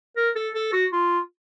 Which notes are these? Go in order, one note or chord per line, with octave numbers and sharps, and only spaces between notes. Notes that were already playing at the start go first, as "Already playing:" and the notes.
A#4
A4
A4
F#4
F4